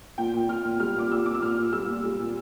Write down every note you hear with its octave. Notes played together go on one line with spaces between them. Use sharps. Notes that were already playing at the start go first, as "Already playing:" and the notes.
A#2 G5
A#2
A#2 F6
A#2
G3 F6
A#2 D6
A#2 E6
A#2 D6
E6
A#2 F6
A#2
G3 E6
A#2
G3
A#2